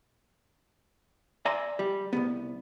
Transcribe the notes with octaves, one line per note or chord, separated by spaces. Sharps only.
D5 E5 G#5 A#5 C6
G3
C2 A#2 B3